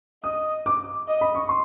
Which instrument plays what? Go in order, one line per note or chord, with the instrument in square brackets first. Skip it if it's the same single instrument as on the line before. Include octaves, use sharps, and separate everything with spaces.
[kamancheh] D#5 [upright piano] D#6
[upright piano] D6
[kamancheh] D#5
[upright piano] B5
C#6
C6